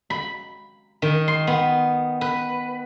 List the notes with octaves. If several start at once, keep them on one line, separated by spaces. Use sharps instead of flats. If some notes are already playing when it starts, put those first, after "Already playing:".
B5
D#3
C6
B3
B4